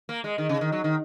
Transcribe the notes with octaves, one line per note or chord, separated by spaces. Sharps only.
A#3
G#3
D#3
C#3
D#3
F#3
D#3